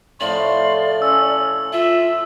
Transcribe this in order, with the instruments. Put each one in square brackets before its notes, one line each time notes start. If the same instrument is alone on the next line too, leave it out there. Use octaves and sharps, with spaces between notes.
[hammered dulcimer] A2 F3 A3 [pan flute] D5 [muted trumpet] C6 [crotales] F#7
[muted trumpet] C#4 [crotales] E6
[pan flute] F4 [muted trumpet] E5